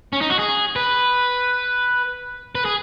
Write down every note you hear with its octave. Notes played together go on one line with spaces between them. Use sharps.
C#4
D#4
F#4
G#4
B4
B4
G#4